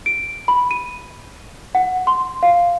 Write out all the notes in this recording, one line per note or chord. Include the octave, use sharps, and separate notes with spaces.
D7
B5
D#7
F#5
C6
F5